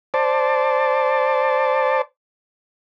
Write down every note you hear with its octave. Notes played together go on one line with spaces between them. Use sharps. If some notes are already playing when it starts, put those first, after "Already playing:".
C5 D5 A5